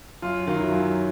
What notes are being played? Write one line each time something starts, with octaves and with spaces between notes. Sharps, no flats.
F#2 F4
D#3 F#3 F4
E4
F#2 F4